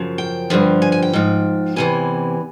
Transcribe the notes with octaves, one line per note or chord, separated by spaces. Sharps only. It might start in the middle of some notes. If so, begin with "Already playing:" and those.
Already playing: F#2 C#3 F3
G5
G2 D3 F3
G#5
G#5
G5
G#2 F3
E2 C3 E3 G#5